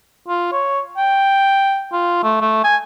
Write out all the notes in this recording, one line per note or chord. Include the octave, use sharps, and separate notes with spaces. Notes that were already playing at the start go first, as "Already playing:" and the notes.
F4
C#5
G5
F4
A3
A3
G#5